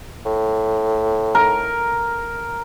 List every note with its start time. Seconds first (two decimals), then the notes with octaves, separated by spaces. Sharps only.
0.26 A2
1.35 A#4